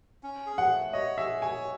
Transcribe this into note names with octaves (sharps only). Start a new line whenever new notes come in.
C#4
G#4
F#5
A3
C#5 D#5
G#4 E5
C#5 G#5